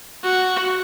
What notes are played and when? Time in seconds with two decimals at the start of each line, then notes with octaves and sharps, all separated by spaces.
0.23 F#4